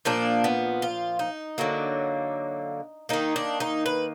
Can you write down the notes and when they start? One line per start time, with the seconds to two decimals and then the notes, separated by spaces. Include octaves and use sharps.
0.05 A#2 F3 A#3 D4
0.44 B3
0.82 F4
1.19 D#4
1.58 D3 F#3 A#3
3.09 D#3 A#3 D#4
3.36 D4
3.60 D#4
3.86 B4